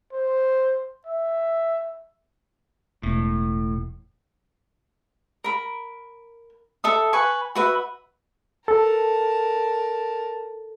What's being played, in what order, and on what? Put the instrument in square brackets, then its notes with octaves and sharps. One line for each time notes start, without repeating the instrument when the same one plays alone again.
[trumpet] C5
E5
[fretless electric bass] E1 [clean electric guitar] A2
[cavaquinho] A#4 B5
A4 E5 D#6
B4 G#5 C#6
F#4 B4 E5
[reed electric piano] A4 [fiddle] A#4 A5